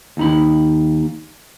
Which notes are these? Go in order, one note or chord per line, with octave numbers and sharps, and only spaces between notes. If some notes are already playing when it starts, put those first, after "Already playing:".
D#2 D#4 B5